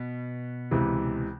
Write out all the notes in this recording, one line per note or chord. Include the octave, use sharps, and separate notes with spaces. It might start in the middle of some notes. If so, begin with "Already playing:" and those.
Already playing: B2 B3
C#2 C3 E3